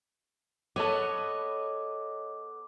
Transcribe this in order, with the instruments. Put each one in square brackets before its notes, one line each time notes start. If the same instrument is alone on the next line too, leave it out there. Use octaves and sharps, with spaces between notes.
[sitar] B3 A4 [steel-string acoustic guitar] C#5 D#5 [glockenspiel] D6